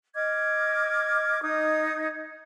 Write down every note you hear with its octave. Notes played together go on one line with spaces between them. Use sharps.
D#5 D6 F6 G#6
D#4 D#5 D#6 G#6